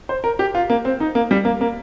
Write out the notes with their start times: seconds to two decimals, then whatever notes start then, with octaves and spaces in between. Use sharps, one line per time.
0.09 C5
0.24 A#4
0.39 G4
0.55 F4
0.70 A#3
0.85 C4
1.00 D#4
1.15 A#3
1.31 G3
1.45 A#3
1.61 A#3